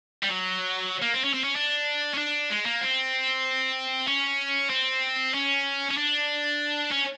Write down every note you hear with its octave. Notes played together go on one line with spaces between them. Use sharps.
G3
F#3
A#3
C4
C#4
C4
C#4
D4
C#4
D4
G#3
A#3
C4
C#4
C4
C#4
C#4
D4
C#4